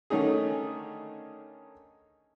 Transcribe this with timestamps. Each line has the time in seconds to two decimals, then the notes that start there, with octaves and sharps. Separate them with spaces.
0.10 D3 D#3 A3 C#4 D#4 G#4